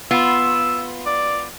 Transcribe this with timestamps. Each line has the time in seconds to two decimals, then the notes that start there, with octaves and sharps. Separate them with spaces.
0.11 B3 F4 E6
1.06 D5